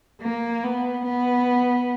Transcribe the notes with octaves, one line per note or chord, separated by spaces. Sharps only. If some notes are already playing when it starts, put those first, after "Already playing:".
A#3
B3
B3